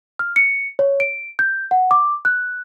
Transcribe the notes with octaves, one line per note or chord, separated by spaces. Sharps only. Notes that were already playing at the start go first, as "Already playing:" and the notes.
F6
C#7
C#5
D7
G6
F#5
D6
F#6